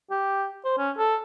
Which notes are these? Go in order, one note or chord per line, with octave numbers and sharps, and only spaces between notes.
G4
C5
C#4
A4